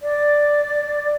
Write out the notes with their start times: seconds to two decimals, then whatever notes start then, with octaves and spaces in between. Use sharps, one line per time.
0.02 D5